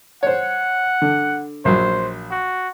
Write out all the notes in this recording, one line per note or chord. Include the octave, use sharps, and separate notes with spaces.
C5 C#5 F#5
D3
A#1 F#3 C5
F#4